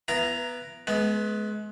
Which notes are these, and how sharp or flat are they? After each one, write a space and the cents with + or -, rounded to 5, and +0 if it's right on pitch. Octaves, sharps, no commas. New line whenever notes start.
B3 +0 E4 +35 A#5 +0
G#3 +35 B3 +0